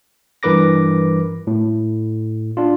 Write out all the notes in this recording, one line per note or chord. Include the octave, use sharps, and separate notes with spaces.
G2 E3 A#4 B4 D6 A#6
A2
D4 F4